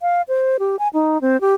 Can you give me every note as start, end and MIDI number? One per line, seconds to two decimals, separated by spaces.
0.02 0.22 77
0.28 0.57 72
0.59 0.76 67
0.79 0.88 80
0.94 1.20 63
1.21 1.40 60
1.41 1.54 67